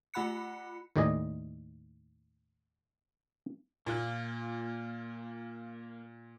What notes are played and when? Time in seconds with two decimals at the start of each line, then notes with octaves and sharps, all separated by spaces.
0.14 A3 F4 F#5 B5 F#6 C#7
0.96 D#2 A2 D#3 D5 D#5 G#5
3.86 A#2 A#3 F4 F#6